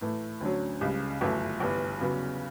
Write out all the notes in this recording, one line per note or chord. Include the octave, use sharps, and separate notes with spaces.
A2 E3 A3
D2 D3 F#3 C#4
C#2 C#3 G3
G1 F#2 E3 A3
G1 G2 E3 B3
E2 C#3 F#3 B3